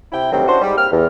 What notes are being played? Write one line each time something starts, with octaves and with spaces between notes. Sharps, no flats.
C3 E4 G5
D2 G2 D#3 F#3 G3 C4
C#4 D4 E4 F#4 C5
G#2 G3
A#3 C4 G4 F6
E2